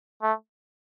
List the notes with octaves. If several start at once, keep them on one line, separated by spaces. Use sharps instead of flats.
A3